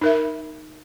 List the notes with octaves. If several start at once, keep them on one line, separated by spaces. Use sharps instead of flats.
D#4 A#4 E5